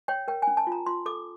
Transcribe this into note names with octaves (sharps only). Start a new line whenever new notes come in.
C#5 G5
A#4 G5
G#5
C#4
A5
F4 A#5
F4 C6
A4 D6